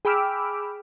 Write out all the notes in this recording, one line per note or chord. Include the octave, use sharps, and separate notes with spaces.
G#4 G5 B5 D6 E6 F6